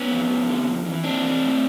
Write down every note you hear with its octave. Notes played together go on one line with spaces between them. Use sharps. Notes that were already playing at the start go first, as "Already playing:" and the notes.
Already playing: B3 C#4
F2
F2
D3
F2
E3
F2 C4 D4
E3
A2